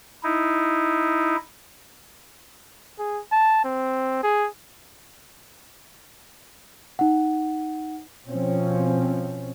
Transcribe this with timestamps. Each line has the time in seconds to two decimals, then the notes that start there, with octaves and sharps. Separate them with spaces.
0.23 D#4 E4
2.99 G#4
3.32 A5
3.64 C4
4.23 G#4
6.99 D#4 F#5
8.28 B2 F3 C4 C#4